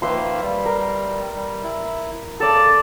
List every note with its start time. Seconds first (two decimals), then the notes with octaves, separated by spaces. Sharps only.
0.02 D#3 F3 A#3 B4 E5 C6
0.42 G3
0.66 A#4
1.35 G3
1.64 E4
2.40 C#3 A4 D5 A5